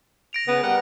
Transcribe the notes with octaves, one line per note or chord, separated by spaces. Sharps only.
A#6 D7 F7
C#3 B3
G3 A#4 F#5